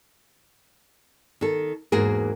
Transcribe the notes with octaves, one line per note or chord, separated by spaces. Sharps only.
D#3 A4
E2 G#2 A#3 F#4 G#4 A#4